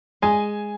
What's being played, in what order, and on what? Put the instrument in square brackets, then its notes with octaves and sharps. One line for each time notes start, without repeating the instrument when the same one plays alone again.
[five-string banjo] G#3 [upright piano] G#5